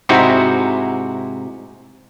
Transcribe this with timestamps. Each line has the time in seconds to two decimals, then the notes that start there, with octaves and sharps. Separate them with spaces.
0.09 G#2 C3 C4 D#4 E4 F#4